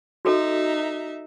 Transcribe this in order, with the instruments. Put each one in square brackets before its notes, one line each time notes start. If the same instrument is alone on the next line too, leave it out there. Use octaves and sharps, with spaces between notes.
[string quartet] D#4 E5 [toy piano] F#4 A4